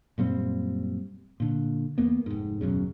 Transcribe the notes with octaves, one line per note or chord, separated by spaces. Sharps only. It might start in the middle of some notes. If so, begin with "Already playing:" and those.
F#2 A#2 G3 C4
A#2 D3
E2 A#3 B3
F1 G#2
D#1 B1 F#2 C#3